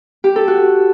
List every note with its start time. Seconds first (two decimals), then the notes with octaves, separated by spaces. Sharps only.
0.24 G4
0.36 A4
0.48 F#4